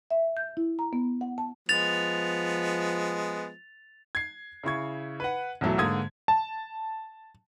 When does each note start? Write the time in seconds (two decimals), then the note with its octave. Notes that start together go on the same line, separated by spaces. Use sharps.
0.11 E5
0.37 G6
0.57 E4
0.79 A#5
0.93 B3
1.21 F#5
1.38 A5
1.69 F3 G#3 B3 A6 F7
4.15 G#6 C7
4.64 C#3 E4 C#6 G#6
5.20 B4 F#5
5.61 B1 E2 E3 F#3 A3
5.78 G#2 D3 A#3 D#6 G#6
6.28 A5